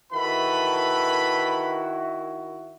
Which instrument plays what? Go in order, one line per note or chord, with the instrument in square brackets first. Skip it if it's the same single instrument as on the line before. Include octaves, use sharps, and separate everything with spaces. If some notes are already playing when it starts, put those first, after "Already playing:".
[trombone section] D#3 E4 F#4 [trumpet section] A4 B4 B5